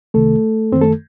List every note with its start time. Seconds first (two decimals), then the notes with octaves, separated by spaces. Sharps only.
0.14 C2 C3 D#3 A3 A4
0.72 F#2 D#3 C4 C5
0.82 A3 A4